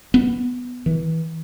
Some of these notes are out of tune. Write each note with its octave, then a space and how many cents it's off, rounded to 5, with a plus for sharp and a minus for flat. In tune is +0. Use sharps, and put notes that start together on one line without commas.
B3 +5
E3 -25